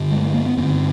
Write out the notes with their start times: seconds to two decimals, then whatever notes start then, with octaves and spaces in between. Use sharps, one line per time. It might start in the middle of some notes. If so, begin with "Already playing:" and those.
Already playing: G2 D3
0.11 G#3
0.22 A3
0.34 A#3
0.46 B3
0.57 G2 D3 C4